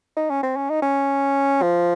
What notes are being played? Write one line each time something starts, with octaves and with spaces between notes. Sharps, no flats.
D#4
C#4
C4
C#4
D#4
C#4
F3